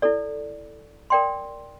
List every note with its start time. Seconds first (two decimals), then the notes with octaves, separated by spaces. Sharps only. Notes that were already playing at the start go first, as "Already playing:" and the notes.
0.02 E4 A4 D5
1.10 A#4 D5 G5 C6